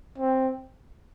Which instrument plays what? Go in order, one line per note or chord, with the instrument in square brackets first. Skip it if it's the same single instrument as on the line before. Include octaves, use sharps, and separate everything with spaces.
[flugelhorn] C4